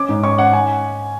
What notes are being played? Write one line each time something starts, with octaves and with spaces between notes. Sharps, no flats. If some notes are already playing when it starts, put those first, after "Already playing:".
Already playing: C#4 D6
G#2
C#4 C#6
C#4 F#5
G#5